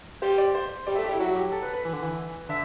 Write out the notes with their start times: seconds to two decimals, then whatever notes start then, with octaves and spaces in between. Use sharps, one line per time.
0.22 G3 C5
0.38 D5
0.55 C5
0.87 G3 D5
0.95 A3 E5
1.04 G4
1.08 G3
1.12 E4
1.20 F#3 F#4
1.36 G4
1.52 A4
1.62 B4
1.73 B4
1.85 E3
1.93 D3
2.03 E3
2.49 D3 E5